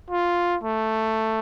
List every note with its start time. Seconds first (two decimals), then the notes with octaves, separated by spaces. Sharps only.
0.10 F4
0.63 A3